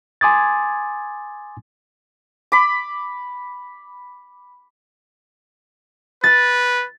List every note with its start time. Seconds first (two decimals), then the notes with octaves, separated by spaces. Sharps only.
0.21 G#5 C6 D6 D#6 G#6 A6
2.52 B5 D6
6.24 B4 A6